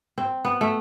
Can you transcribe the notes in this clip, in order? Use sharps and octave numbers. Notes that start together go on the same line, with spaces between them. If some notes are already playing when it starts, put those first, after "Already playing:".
C4
B3
A3